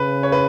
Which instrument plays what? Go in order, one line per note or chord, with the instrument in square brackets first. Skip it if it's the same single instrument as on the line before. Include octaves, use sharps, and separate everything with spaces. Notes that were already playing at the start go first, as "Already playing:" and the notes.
Already playing: [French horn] C#3 [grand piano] B4
[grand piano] C#5
B4